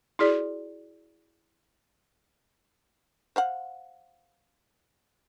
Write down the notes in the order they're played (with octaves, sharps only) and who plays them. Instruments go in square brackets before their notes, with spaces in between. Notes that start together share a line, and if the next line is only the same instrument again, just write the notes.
[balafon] E4 F#4 G#4 D5
[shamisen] C5 F5 F#5